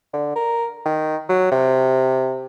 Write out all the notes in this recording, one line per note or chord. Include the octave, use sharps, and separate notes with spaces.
D3
A#4
D#3
F#3
C3